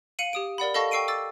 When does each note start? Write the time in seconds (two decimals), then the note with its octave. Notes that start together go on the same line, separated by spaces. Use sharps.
0.19 F5 C#7 D#7 F#7
0.33 G4 D#6 D7
0.58 A#4 D5 F#5 B5
0.74 A4 D#5 F5 A5 C#6 A#6
0.91 G5 C#6 E6 C7 D7 D#7
1.08 D6 E6 A6